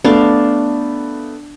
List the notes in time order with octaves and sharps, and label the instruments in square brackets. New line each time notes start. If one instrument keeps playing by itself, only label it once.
[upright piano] A3 B3 [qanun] D4 F5